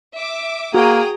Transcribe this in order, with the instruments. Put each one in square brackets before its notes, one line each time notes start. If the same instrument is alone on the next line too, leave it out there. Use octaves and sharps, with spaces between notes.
[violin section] E5 D6
[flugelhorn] A#3 [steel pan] F#4 [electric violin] G#4 [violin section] G5 A#5 D#6